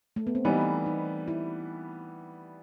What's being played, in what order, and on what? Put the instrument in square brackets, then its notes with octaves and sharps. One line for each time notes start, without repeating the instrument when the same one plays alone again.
[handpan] A3
B3
C4
[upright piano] E3 G3 B3 [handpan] D#4
[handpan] D#4
E4